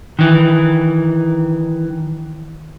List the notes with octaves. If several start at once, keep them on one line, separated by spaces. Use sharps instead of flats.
D#3 E3